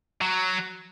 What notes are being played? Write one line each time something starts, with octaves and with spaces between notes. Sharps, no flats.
F#3